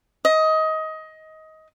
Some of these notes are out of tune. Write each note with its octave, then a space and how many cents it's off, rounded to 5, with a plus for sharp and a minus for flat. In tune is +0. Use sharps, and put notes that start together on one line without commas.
D#5 +20